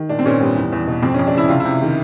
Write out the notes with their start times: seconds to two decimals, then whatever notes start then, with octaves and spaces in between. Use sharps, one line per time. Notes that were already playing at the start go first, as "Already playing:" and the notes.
Already playing: D#3
0.09 A#2 D4
0.19 C4
0.26 A#2 C#4
0.40 G3 B3
0.56 E2
0.73 E2
0.87 B2
1.02 F2 C4
1.14 C#4
1.19 F2
1.27 D4
1.34 C#3 E4
1.49 C3 F4
1.60 E4
1.65 C3
1.81 D#3